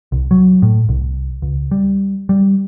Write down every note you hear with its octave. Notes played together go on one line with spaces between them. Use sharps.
C2
F#3
A2
C2
C#2
G3
G3